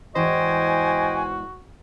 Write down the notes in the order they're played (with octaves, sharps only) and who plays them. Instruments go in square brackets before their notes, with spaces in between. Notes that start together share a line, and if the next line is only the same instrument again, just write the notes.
[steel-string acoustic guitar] E2 G#2 E3 [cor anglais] F#4 [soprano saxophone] C5 [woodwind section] D#5 G5 G#5